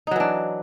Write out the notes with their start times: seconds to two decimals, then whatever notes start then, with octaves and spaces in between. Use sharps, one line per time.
0.07 D#4
0.11 F#3
0.16 E3
0.20 D4